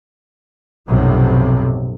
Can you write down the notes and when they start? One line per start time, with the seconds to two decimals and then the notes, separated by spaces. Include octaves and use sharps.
0.88 B1 F#2 A2 C3 F3